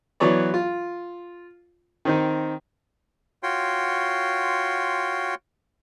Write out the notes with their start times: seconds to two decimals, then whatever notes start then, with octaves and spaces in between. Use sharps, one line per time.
0.20 E3 F#3 B3 C#5 D5
0.54 F4
2.05 D#3 C4 D#4
3.43 F4 F#4 C#5 G5 C6